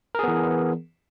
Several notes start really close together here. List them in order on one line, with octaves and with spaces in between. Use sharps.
A#4 G#4 B3 E3